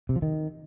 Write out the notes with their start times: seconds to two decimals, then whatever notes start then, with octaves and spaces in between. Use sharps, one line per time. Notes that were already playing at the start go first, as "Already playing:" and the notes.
0.09 C3
0.16 F3
0.22 D#3